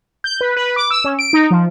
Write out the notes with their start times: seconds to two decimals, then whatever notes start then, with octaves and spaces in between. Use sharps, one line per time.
0.24 G6
0.41 B4
0.56 B4
0.76 D6
0.91 E6
1.04 C#4
1.19 D7
1.33 D#4
1.51 F3